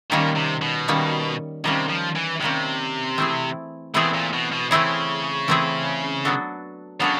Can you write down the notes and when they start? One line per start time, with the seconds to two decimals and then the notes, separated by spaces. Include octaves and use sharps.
0.12 A#2 D#3 G3 A#3 C#4
0.36 C3
0.62 B2
0.88 D#3 G3 A#3 C#4
1.64 C3 D#3 G3 A#3 C#4
1.90 F3
2.16 E3
2.41 C3 D#3 G3 A#3 C#4
3.18 E3 A3 C4 E4 G#4
3.94 B2 E3 A3 C4 E4 G#4
4.14 A#2
4.33 B2
4.53 B2
4.71 C#3 E3 A3 C4 E4 G#4
5.48 E3 A3 C4 E4 G#4
6.25 F#3 B3 D4 F#4 A4
7.00 C#3 F#3 B3 D4 F#4 A4